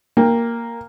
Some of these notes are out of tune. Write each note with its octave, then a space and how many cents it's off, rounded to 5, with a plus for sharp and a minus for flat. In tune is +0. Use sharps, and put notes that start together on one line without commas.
A#3 +0 G5 +20